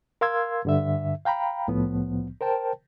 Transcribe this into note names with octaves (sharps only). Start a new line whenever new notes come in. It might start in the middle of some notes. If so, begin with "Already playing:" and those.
A#4 F5 C6 E6 G#6
G2 D3 E5
F5 G5 A#5 B5
C2 A2 F3 B3
A#4 C5 G5 A5